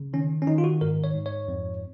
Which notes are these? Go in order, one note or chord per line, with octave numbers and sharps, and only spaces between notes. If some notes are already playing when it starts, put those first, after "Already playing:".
Already playing: C#3
D#3 C#4
C#4
D#3 D#4
F4
F#4
G#2 A#4
C#5
G#2
C#5
F2